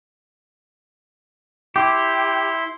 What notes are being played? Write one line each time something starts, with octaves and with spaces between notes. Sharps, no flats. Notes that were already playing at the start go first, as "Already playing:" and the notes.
E4 G4 C6